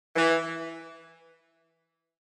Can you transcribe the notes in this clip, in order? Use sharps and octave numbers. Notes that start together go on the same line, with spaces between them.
E3